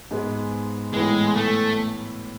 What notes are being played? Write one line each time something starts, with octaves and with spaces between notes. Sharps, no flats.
G#2 G#3 B3
A2 E3 G#3 B3 E4 B4
A3